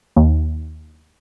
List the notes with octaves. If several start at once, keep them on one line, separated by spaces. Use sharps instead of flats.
D#2